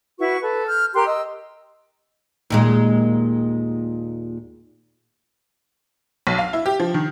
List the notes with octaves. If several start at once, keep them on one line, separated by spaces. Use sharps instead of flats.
E4 F#4 B4 C#6
A4 B4
F6 G6
G4 A#4 C6 F#6
D#5 E6
D#2 A#2 G#3
B1
F5
E4
G4
F3
D#3